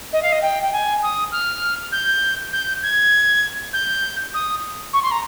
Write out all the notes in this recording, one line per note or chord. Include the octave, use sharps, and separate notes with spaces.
D#5
F5
D#5
G5
G5
G#5
D#6
F6
G6
G6
G#6
G6
D#6
C#6
C6
A#5